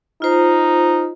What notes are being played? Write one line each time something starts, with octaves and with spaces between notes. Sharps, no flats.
D#4 F4 C5